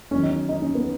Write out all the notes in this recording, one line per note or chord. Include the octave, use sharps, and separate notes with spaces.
E2 D#3 F#3 C#4
D#4
D#4
C#4
B3